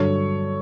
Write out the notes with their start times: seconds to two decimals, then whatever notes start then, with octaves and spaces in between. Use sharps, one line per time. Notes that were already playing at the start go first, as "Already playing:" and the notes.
Already playing: G2 D3 F#3 A4 C#5